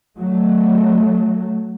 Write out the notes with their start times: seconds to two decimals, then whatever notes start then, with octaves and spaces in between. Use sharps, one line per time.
0.18 F#3 A3